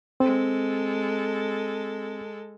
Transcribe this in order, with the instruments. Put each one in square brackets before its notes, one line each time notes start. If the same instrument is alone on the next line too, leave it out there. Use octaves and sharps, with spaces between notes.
[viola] G#3 A4 [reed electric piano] C4